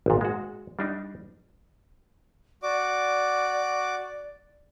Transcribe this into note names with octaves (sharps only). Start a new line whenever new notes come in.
G#1 A#2
G#3 F#4
G3 D4 D#4
F#4 D5 D6